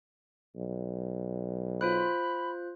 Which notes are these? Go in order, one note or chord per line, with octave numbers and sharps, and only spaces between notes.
B1
F4 C5 B5 F#6